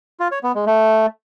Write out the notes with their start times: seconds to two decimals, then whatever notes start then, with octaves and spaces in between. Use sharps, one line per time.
0.20 F4
0.32 C#5
0.43 B3
0.55 G#3
0.67 A3